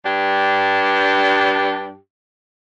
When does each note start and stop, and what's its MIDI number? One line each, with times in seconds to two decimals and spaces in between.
0.05 1.95 43
0.05 1.95 62
0.05 1.95 67